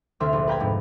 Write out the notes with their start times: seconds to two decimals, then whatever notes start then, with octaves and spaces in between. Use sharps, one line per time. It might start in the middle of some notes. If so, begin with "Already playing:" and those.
0.20 D2 C3 E5 C6 F6
0.33 A#1
0.47 B4 F5 G5 A#5 B5 G#6
0.59 F2 G#2 C3